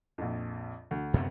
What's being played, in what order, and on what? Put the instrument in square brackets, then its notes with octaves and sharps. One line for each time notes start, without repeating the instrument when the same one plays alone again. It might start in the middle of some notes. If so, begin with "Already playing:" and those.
[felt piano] A#1 F2
D2
[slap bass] F#2 C3 B3